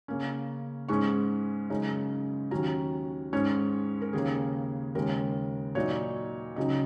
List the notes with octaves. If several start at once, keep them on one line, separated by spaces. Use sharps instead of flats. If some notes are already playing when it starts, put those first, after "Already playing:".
C#3 A#3 C#4
G#2 G#3 C#4 C#6
F#2 C#3 G#3 D#4
D#2 D#3 F#3 C#4 A#5
G#2 G#3 C#4 C#5
A#4
D#2 C#3 A#3 G#4
D#2 C#3 G#3 A#4
A#2 F#3 D#4 C#5
C#2 C#3 F#3 D#4 D#5